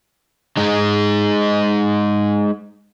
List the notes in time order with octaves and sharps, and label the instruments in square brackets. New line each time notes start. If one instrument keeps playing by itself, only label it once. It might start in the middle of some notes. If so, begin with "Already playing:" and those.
[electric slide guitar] G#3 D#4